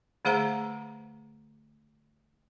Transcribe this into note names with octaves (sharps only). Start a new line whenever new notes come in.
D3 A3 G#4 C5 F5 A#5